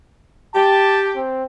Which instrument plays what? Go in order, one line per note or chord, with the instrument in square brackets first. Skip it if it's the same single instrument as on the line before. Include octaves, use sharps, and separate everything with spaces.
[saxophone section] G4 [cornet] A5
[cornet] C4